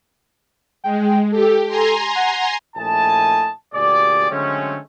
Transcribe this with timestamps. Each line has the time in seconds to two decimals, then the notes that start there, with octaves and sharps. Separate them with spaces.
0.84 G#3 G5
1.32 G4 A4
1.67 G#5 A#5 C6
2.15 F#5
2.76 A#1 A3 E4 D#5 G#5 A5
3.74 D2 A#2 G4 G#4 D5
4.30 D3 F#3 G#3 A3 C4 C#4